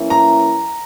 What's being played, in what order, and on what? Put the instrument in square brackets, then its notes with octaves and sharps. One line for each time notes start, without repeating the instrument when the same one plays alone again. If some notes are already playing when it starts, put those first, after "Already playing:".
Already playing: [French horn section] E3 A#3 C#4 E4
[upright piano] A#5